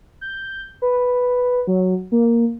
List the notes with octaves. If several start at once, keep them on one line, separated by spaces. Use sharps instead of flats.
G6
B4
F#3
A#3